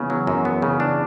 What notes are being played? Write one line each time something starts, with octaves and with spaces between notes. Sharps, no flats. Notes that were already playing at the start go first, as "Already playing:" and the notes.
Already playing: E2 C#3
F#3
F#2
B3
C#3
D4